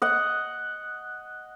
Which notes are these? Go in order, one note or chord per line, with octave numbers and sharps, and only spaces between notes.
D#5 F#5